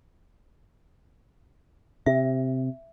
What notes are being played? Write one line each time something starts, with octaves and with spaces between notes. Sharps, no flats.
C3 E5